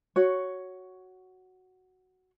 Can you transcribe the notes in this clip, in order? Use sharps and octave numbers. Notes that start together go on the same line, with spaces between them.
F#4 C#5